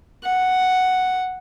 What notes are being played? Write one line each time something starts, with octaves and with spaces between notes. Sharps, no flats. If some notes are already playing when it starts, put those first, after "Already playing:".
F#5